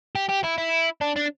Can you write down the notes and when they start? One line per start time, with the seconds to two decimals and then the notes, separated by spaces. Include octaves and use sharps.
0.15 G4
0.29 G4
0.44 E4
0.58 E4
1.01 D4
1.16 D4